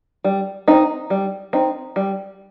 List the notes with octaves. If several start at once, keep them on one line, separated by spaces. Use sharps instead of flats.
G3
C4 D#4
G3
C4 D#4
G3